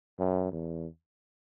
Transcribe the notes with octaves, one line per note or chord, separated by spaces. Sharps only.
F#2
E2